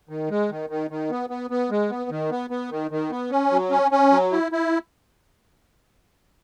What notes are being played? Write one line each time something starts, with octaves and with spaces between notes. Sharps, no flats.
D#3
G#3
D#3
D#3
D#3
B3
B3
B3
G#3
B3
D#3
B3
B3
D#3
D#3
B3
C#4
F#3
C#4
C#4
F#3
E4
E4